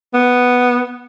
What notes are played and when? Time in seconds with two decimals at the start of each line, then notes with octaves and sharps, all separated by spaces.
0.14 B3